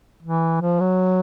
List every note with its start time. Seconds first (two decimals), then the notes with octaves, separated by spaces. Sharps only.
0.23 E3
0.61 F3
0.80 F#3